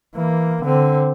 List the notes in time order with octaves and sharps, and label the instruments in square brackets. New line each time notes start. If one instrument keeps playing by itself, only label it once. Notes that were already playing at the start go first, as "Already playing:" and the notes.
[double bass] E3 A#3
D3 C4